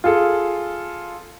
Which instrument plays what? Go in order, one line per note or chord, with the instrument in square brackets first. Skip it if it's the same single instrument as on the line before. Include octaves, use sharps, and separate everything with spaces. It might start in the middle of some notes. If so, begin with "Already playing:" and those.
[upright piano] F4 G#4 A4